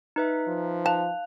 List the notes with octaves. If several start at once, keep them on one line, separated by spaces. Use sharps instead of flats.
D#4 B4 E5
F3
F5 A5 F#6 F7